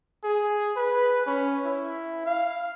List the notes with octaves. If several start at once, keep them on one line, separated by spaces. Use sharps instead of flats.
G#4
B4
C#4
E4
F5